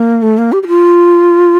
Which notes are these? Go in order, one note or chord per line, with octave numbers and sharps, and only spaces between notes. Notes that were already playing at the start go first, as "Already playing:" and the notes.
Already playing: A#3
A3
A#3
G4
G4
F4